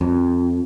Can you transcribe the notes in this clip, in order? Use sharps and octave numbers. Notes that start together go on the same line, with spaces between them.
F2